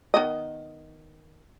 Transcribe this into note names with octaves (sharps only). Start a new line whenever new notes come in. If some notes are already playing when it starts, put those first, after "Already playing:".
D#3 B3 D#5